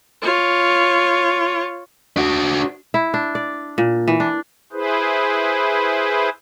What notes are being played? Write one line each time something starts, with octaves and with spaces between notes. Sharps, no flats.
F4 C#5
D4 F#4
E4
D4
D5
A#2
E3
D4
E4 G#4 B4 C5